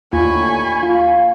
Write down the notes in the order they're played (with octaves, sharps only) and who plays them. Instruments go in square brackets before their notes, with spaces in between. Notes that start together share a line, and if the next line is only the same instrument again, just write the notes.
[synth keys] D#2 [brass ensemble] A2 D3 D#3 [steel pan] F4 [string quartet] G#5 B5 C#6
[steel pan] F4 [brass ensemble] F5